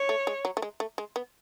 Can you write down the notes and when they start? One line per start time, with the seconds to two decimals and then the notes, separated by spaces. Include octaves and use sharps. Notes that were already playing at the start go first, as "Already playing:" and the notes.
Already playing: C#5
0.09 A3
0.27 G#3
0.45 F#3
0.57 A3
0.62 G#3
0.80 A3
0.98 G#3
1.16 B3